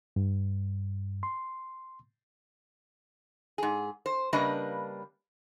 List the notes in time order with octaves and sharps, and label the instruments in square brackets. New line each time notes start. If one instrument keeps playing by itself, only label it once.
[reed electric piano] G2
C6
[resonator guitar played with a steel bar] G#2 G#4
C5
C#3 G3 A#3 D4 B4 D#5